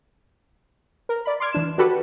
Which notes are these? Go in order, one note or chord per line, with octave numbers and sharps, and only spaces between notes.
A#4
D5 B5
C6 D6 F6 G#6 D7
E3 D4 E7
D4 F#4 G4 A4 B4 F#5